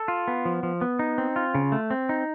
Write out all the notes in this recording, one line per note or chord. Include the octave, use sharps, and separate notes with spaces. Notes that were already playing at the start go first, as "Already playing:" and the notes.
Already playing: A4
F4
B3
F3
F3
B3
D#4
C4
F4
C#3
A3
C4
D#4